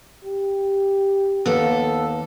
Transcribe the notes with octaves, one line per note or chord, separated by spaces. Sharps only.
G4
D#2 A#3 B3 A4 A5